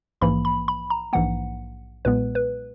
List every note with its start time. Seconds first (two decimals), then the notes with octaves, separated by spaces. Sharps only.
0.21 A#1 G#2 E3 A#3 B5
0.45 B5
0.68 B5
0.90 A#5
1.13 A#1 G#2 E3 A#3 F#5
2.05 B1 A#2 G#3 B3 B4
2.35 B4